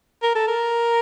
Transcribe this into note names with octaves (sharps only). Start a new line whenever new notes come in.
A#4
A4
A#4